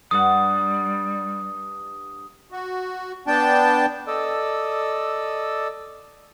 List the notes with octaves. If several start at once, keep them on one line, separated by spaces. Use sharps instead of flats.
G2 G3 F#5 D#6
F#4
B3 D4 G5 A5
A4 D5 D#5 E6